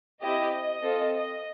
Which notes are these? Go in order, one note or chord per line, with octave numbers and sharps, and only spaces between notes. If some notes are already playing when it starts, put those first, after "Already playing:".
C4 E4 G4 D#5
D#5
C4 F4 A4
D#5